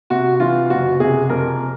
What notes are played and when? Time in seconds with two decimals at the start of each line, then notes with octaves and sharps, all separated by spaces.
0.10 C3 F#4
0.40 E3 F4
0.70 F#1 F#4
1.00 C3 G#4
1.29 F2 A#4